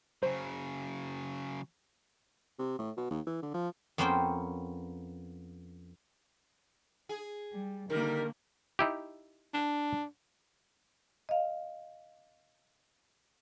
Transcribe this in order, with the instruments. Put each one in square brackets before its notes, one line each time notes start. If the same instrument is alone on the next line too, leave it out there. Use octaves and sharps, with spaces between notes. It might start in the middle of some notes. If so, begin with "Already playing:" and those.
[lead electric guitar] C#3 F#3 [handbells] C5
[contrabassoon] C3
A2
B2
D#2
E3
D3
F3
[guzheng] F2 A#3 B3 C#4 C5 G5
[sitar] G#4
[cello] G3
[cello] D3 A#3 [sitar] D#3 G3 [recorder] A#4
[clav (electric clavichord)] D#4 E4 G4
[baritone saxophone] D4
[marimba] D#5 F5